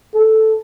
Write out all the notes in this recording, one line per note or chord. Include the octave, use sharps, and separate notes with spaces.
A4